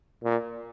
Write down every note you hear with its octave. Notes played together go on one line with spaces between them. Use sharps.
A#2